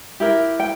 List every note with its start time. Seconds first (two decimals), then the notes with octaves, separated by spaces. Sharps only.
0.20 E4 G4 A#4
0.60 G5